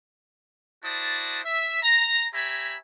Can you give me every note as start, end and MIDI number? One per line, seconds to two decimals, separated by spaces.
0.84 1.40 64
0.84 1.40 66
0.84 1.40 72
0.84 1.40 74
0.84 1.40 81
0.84 1.40 87
1.45 1.80 76
1.83 2.27 82
2.34 2.77 67
2.34 2.77 73
2.34 2.77 76
2.34 2.77 80
2.34 2.77 82
2.34 2.77 83